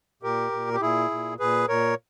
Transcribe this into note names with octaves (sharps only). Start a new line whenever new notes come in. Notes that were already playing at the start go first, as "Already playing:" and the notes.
A#2 G4 A#4
A#2
G4
A#2 E4 G#4
A#2
A#2 G#4 B4
A#2 A#4 C#5